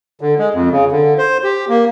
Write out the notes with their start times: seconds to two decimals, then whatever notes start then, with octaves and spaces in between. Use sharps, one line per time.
0.21 D3
0.39 G#3
0.54 F2
0.71 C#3
0.92 D3
1.18 C5
1.44 G4
1.69 A#3